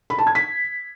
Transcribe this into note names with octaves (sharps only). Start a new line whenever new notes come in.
B5
A5
G#6
B6